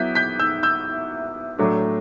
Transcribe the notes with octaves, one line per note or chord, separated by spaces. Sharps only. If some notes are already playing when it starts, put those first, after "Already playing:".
Already playing: F#3 B3 E4 G6 B6
G6 B6
E6 G6
E6 G6
A2 F#3 A3 D4